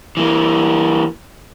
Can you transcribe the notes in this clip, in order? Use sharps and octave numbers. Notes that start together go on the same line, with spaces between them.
E3 A#3